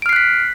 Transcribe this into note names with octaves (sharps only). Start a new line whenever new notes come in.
F6 F#6 B6 C7 D7